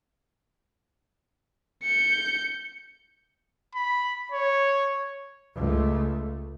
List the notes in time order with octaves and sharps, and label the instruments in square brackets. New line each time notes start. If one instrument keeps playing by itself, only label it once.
[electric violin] G6 C#7
[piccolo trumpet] B5
C#5
[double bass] C#2 A3